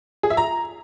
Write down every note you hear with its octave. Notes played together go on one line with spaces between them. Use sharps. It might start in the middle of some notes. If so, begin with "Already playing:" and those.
G#4
E5
A#5